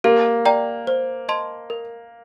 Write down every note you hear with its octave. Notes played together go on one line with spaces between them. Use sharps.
A#3 G4
D5 G5 A#5
C5
D#5 A5 C6
A#4